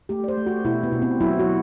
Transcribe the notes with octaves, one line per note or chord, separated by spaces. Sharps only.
A3 G4
D5
C5
A3
F#4
B2 E4
B3
B2
C4
F#3 E4
F#4